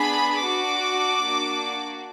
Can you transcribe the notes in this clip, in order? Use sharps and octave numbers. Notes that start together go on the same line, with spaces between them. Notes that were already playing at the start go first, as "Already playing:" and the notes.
Already playing: B3 D4 G#4 B5
D4 F#4 D6
A#3 D4 F#4